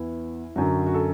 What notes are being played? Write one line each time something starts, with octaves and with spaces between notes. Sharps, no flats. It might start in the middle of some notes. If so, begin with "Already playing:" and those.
Already playing: E2 E3 E4
F#2 D3 F#3 F#4
F#4
A4